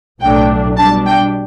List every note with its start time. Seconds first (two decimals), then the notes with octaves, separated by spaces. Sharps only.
0.21 B1 A2 F#3 A3 D4 G5
0.77 B2 G3 D4 A5
1.06 G5